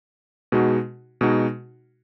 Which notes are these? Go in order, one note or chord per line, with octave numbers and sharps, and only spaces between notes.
B2 G#3 D#4 F#4
B2 G#3 D#4 F#4